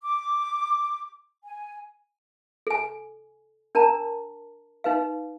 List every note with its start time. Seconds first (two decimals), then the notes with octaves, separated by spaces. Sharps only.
0.03 D6
1.45 G#5
2.67 A4 G#5
3.75 D4 A#4 A5 A#5
4.84 D#4 B4 F5